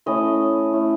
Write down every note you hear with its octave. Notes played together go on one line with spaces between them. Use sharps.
A3 C#4 E4 D#5
A3 C#4 E4